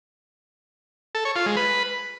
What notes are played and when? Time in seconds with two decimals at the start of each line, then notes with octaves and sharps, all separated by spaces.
1.15 A4
1.25 C#5
1.36 F4
1.46 G#3
1.57 B4